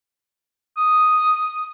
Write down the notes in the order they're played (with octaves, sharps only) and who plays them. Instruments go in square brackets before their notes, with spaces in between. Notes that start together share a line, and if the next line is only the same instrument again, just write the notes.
[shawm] D#6